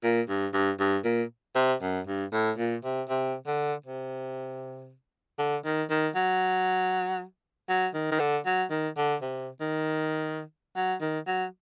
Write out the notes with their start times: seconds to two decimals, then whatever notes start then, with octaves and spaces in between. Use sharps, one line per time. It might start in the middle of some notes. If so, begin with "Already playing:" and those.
0.03 A#2
0.29 G2
0.53 G2
0.80 G2
1.05 A#2
1.56 C3
1.82 F#2
2.07 G2
2.33 A2
2.58 A#2
2.84 C3
3.09 C3
3.47 D3
3.86 C3
5.39 D3
5.65 D#3
5.90 D#3
6.15 F#3
7.69 F#3
7.94 D#3
8.12 D#3
8.20 D3
8.46 F#3
8.71 D#3
8.97 D3
9.22 C3
9.61 D#3
10.76 F#3
11.01 D#3
11.27 F#3